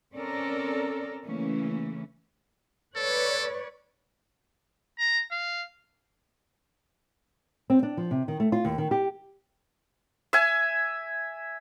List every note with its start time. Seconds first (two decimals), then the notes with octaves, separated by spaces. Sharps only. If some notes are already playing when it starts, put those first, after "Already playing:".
0.14 C4 C#4 A4 A#4 D5
1.24 C#3 E3 A3 A#3 C#4
2.96 A4 B4 C#5 D5
4.98 A#5
5.32 F5
7.70 C4
7.83 D4
7.97 F3
8.11 C3
8.28 D#3
8.40 A3
8.52 F4
8.65 D#2
8.78 D#3
8.91 G4
10.33 E5 G#5